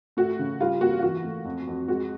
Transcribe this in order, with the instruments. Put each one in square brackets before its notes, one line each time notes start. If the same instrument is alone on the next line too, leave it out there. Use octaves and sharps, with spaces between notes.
[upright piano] A3 F#4
C#3
G3 F4
A#3 F#4
F4
E3 F#4
A3
F2
F2
G#3 F#4